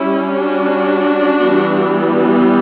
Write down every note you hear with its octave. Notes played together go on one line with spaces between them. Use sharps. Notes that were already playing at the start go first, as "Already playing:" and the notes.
Already playing: G3 C#4 E4
D4 F#4
E3 G3 B3